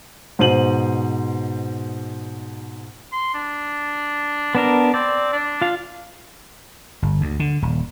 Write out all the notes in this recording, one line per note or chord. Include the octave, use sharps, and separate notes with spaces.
G#2 B2 C5 D#7 F#7
C6
D4
B3 D4 A#4 A5
C4 D5
D4
F4 F5
G1
D2
D3
D#1